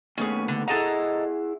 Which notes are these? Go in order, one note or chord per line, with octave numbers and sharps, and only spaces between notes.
D#2 A3 B3 C#4 G#4
D3
E4 G#4 A4 D#5 F#5 A#5